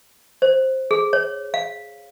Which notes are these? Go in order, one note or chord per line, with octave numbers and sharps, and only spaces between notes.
C5
G#4
C#5
F5